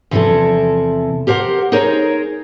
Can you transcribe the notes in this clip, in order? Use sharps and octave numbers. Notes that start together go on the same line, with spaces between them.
E2 C3 F3 E4 A4
G4 A#4 C5 F5 F#5
D#4 G#4 A#4 C5 C#5